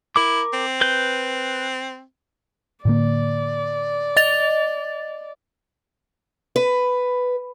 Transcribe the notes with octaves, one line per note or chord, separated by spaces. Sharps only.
E4 A#4 D6
C4
B4 G6
A2 D3 A#3 D5
D#5 A6 F7
B4